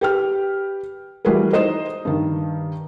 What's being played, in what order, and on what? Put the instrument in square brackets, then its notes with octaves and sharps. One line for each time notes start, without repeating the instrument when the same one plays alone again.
[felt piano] G4 B4 G5 F6
E3 G3 F#4 G#4 A#4 B4
D#4 C5 D#5 D#6 E7
G2 D#3